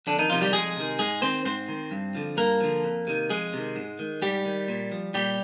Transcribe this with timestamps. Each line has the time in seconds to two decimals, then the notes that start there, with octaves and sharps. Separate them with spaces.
0.07 F2 D3 D4
0.19 D#3 D#4
0.30 C3 D#3 F3 F4
0.42 G3 G4
0.53 F2 G#3 G#4
0.76 C3 D#3
0.99 G#2 G#3 G#4
1.22 D#3 C4 C5
1.45 G#2 C4 C5
1.68 D#3
1.91 G2
2.15 D3 F3
2.37 G2 A#3 A#4
2.61 D3 F3
2.84 F2
3.07 C3 D#3
3.29 F2 G#3 G#4
3.53 C3 D#3
3.76 G#2
3.99 D#3
4.22 G#2 G3 G4
4.45 D#3
4.68 A#2
4.92 F3
5.14 A#2 G3 G4